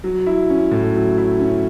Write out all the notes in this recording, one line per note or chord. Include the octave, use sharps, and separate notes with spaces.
F#3
E4
C#4
A2
F#3
E4
C#4